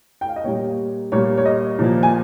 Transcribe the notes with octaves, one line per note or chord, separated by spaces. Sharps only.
G5
F5
D#5
A#2 G3 A#3 C#5
A#2 G3 A#3 C#5
C#5
D#5
A#2 F3 A#3
G#5